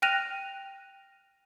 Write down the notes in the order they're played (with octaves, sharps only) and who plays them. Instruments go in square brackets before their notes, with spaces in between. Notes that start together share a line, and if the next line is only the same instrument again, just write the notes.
[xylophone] G5 F6 F#6 A#6 D#7 F7